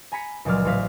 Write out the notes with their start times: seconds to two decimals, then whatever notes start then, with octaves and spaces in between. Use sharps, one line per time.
0.12 G#5 A#5 B5 B6 C#7
0.45 C#2 A#2 F3 F#3 D5 F6
0.65 A1 F#3 C5 F5 B6